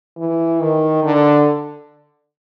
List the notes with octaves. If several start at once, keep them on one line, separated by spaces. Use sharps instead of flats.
E3
D#3
D3